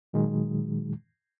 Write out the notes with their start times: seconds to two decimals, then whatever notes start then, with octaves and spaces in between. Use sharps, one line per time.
0.13 A#2 D#3 F#3 G#3